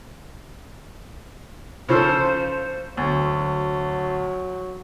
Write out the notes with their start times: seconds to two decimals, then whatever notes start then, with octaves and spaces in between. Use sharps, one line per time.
1.89 C#3 F3 A4 C5
2.97 D2 F#3